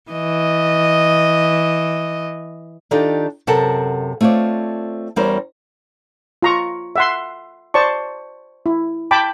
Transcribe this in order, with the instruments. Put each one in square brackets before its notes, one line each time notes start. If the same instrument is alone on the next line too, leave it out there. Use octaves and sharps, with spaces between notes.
[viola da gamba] E3 D#5
[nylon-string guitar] D#3 D4 D#4 F4 G4 A4
F#2 C3 A4 A#4 F#5 A5
A3 C4 F4 C#5 D5
E2 G3 C#4 E4 A#4 C5
[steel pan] F4 A#5 C#6
E5 F#5 C6
C5 D5 A5 C#6
E4
G5 A5 B5 D6